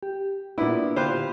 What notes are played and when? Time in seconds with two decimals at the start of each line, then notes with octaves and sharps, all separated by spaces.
0.03 G4
0.58 A#2 B3 D4 E4
0.96 D3 F4 G4 B4 C5 F5